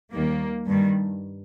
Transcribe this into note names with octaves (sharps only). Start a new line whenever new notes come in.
D#2 D#3 G3 A#3
G2 D#3 G3